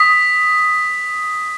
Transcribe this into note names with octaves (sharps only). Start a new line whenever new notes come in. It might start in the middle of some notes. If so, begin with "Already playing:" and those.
Already playing: D#6 B6